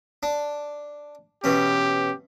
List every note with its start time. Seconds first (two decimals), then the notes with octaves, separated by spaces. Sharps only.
0.23 D4
1.44 B2 E3 C#4 G4